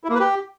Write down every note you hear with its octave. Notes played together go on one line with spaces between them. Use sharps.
E4
A#3
B4
G4